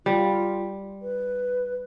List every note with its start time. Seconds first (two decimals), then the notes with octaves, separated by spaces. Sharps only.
0.06 G3 F4
1.02 B4